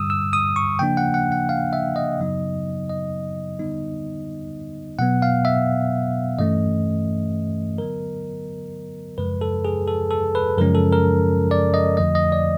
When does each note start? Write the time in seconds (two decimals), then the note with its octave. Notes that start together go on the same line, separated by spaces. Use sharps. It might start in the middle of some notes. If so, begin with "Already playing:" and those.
Already playing: G2 D3 G3 D#6 E6
0.10 E6
0.33 D#6
0.56 C#6
0.79 C#3 F3 A#3 D4 G5
0.97 F#5
1.14 F#5
1.32 F#5
1.49 F5
1.73 E5
1.96 D#5
2.20 F#2 C#3 F#3 B3 D#4
2.90 D#5
3.59 D3 G3 B3 D#4
4.99 B2 F#3 B3 F#5
5.22 F5
5.45 E5
6.39 G2 E3 A3 C#4 D#5
7.78 D3 F#3 B3 A#4
9.18 F#2 C#3 F3 G#3 B4
9.41 A4
9.65 G#4
9.87 A4
10.11 A4
10.35 B4
10.58 F#2 C#3 F3 G#3 C#4 A#4
10.75 A4
10.93 A#4
11.51 D5
11.74 D#5
11.97 F2 D3 F3 A3 D#5
12.15 D#5
12.32 D5